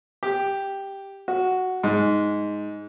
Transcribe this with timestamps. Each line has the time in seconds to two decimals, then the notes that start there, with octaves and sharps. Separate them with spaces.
0.23 G4
1.28 F#4
1.84 G#2